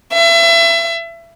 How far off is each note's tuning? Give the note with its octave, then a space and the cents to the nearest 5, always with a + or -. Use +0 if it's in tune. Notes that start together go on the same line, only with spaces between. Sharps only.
E5 +30